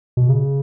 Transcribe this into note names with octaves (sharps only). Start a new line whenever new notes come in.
B2
C#3